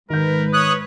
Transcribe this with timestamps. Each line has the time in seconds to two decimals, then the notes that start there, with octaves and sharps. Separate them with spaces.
0.10 G#2 D#3 A#4 B4 G6
0.53 C#5 D#6 F#6